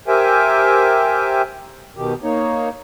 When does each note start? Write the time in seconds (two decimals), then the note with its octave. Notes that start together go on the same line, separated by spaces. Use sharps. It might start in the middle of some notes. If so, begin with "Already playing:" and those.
0.08 G4 A#4 C5 E5 G5 G#5
1.97 B2 D#3 G4
2.23 A#3 D#4 C#5